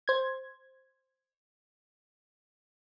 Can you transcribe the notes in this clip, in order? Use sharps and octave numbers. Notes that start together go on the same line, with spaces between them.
C5 G#6